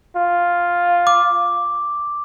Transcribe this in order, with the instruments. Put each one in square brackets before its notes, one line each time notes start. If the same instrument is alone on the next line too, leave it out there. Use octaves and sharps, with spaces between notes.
[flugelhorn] F4
[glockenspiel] D6